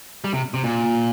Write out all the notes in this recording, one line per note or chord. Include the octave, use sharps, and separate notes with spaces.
G3
C3
C3
A#2